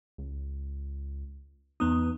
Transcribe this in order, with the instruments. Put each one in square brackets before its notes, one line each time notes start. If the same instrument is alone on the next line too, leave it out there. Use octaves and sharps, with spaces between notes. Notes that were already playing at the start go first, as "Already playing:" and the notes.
[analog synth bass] C#2
[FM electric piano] E2 B3 D#6 [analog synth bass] D#4